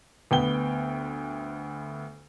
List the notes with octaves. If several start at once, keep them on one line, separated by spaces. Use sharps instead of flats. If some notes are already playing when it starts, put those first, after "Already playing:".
D2 B3 G5 G7